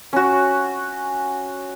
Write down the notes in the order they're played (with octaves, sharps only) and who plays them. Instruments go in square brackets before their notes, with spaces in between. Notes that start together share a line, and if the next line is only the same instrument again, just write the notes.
[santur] C#4 F#4